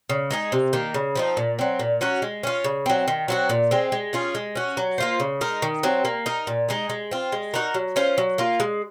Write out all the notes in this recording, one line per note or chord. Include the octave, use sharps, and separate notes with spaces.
C#3
G#3 D#4 G#4
C3
D#3 A#3
C#3
F3 C4 D#4
A#2
F#3 C4
A#2
F#3 C#4 F#4
G#3
C#4 F4
C#3
F#3 C4
D#3
F#3 C4 F#4
A#2
G#3 C4
G#3
C#4 F4 G#4
G#3
C#4 F#4
F#3
A#3 F4 C5
C#3
G#3 D#4 A#4
D#3
F#3 C4
A#3
D#4 A#4
A#2
G#3 D#4 G#4
G#3
C4 F4
G#3
D#4 F#4 A#4
F#3
C#4 F4 C5
F#3
A#3 F4
G#3